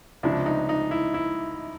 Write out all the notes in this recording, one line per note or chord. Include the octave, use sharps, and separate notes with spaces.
C#2 C3 F3 D4
D#4
D#4
E4
E4